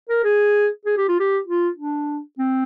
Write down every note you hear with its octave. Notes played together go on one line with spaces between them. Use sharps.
A#4
G#4
G#4
G4
F4
G4
F4
D4
C4